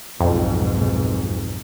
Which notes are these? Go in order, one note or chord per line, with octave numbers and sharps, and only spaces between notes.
B1 F2 G#2 B2